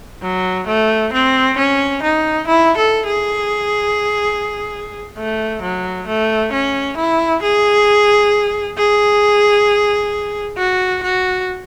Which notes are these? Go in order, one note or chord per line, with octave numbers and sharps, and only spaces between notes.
F#3
A3
C4
C#4
D#4
E4
A4
G#4
A3
F#3
A3
C#4
E4
G#4
G#4
F#4
F#4